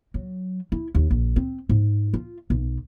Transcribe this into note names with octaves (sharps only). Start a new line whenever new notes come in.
F#3
E4
D#2
A#1
C4
G#2
F4
B1